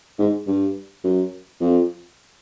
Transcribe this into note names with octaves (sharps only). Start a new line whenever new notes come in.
G#2
G2
F#2
F2